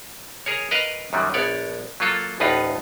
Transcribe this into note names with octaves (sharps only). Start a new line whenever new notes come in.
G#4 A#4 C#5
A#4 B4 D#5 F5
F#2 D#3 F#3 G3
A#1 B3 C#5 D5
F#3 A#3 F4 A4
A1 D2 A2 D#4 F4 B4